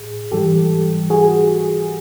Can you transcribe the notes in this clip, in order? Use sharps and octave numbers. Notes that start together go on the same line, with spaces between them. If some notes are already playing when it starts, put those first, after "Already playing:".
Already playing: A2 G#4
G#2 E3 G3 G4 A4
F#4 G#4